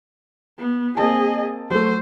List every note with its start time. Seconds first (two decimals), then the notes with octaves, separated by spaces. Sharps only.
0.59 B3
0.97 A#3 C4 G#4 D#5 A5
1.71 F#3 A3 C5